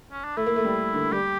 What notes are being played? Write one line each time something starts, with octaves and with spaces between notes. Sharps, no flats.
C#4
D4
A3 E4
A#3
A3
G3
D3
G3 G4